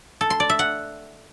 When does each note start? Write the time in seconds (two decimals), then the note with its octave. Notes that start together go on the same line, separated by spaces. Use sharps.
0.21 A4
0.30 C6
0.40 D5
0.49 E5
0.59 F#5